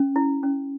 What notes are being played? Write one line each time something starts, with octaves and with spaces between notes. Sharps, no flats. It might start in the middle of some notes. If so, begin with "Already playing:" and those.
Already playing: C#4
E4
C#4